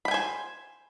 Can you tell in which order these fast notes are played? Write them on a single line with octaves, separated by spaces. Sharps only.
B5 G5 G#5 C5